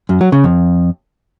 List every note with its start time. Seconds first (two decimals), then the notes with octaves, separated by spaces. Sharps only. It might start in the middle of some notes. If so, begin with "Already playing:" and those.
0.09 F#2
0.21 F#3
0.32 C#3
0.44 F2